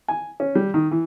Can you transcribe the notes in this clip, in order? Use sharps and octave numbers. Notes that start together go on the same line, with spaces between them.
G#5
C#4
G3
D#3
E3